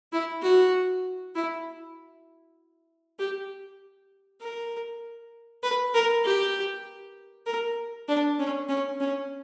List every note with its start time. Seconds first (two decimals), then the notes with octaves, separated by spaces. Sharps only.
0.13 E4
0.42 F#4
1.35 E4
3.19 G4
4.41 A#4
5.63 B4
5.94 A#4
6.24 G4
7.46 A#4
8.08 D4
8.39 C#4
8.69 C#4
9.00 C#4